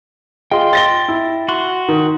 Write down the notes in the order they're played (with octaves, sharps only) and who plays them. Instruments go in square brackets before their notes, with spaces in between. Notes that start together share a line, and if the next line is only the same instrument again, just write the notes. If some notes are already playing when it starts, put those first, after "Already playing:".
[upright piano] F4 G#4 D#5 [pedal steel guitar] G5 C6
[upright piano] A6 A#6 G7
E4
[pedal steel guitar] F#4 C6 F#6
[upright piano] D#3